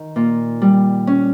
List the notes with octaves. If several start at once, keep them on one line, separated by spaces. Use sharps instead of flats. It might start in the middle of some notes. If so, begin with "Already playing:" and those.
Already playing: D#3
A#2
G3
C#4